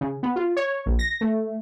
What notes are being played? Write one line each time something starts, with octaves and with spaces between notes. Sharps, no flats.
C#3
B3
F4
C#5
A#1
A#6
A3